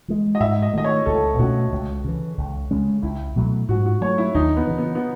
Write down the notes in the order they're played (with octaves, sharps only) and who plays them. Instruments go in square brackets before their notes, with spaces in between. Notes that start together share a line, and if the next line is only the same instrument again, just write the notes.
[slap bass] E3 G#3
[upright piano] D#5
[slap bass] G#2 [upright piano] E5
[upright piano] D#5
[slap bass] D#3 A3 [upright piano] D#5
[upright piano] C#5
[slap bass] C#2 [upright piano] A4
[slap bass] B2 A3 C#4 [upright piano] F#4
[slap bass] C#2
C#3 E3
C#2
C#3 G#3 C#4
[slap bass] C#2 [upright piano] E4
[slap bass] B2 F#3 A3
[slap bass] G#2 [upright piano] F#4
[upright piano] F#4
[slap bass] F#3 A3 [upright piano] C#5
[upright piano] E4
[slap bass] D#2 [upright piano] D#4
[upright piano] B3
[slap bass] C#3 E3
[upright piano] B3
B3